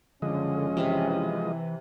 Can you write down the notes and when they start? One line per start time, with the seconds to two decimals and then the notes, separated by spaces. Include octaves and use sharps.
0.22 F#1 D3 F3 G#3 C#4 D#5
0.77 C3 E3 E5 F5